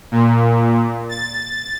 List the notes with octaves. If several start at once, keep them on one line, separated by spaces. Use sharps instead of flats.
A#2
A6